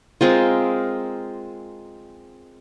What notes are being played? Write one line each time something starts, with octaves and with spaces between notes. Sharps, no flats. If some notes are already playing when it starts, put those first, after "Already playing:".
G#3 C4 F4 A#4